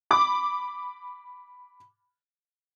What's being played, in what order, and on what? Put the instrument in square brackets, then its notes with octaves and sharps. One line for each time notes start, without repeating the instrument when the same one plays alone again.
[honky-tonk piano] B5 D6